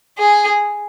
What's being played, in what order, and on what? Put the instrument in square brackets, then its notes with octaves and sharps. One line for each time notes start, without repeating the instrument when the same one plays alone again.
[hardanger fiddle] G#4